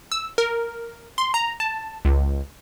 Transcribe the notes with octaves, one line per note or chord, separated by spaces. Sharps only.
E6
A#4
C6
A#5
A5
C#2